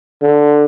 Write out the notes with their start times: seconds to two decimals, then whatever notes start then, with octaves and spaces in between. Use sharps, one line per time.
0.22 D3